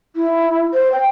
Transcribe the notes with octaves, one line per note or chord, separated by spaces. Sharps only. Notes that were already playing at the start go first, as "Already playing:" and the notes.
E4
C5
G5